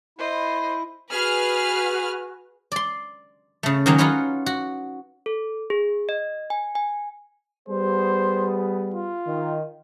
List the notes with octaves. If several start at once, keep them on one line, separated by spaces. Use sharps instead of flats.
E4 C5 D#5
F#4 G#4 B4 F6
D5 C6
C#3 A3
D#3 F#3 G#3 A#3 C#4 D#4
C#4 D#4 F4 F#4 B4 C#5
F#4
A4
G#4
D#5
G#5
G#5
G3 B3 G#4 C5
F4
D#3